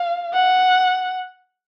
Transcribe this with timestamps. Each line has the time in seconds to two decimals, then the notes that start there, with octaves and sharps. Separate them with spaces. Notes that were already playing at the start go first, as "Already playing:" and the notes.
Already playing: F5
0.34 F#5